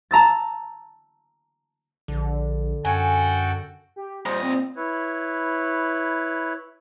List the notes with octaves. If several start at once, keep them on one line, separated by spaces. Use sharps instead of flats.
A5 A#5 E6 A6
A#1 D3
F#2 F#4 A4 G5 G#5
G4
A#2 C5 D#5
C4
E4 B4 C#5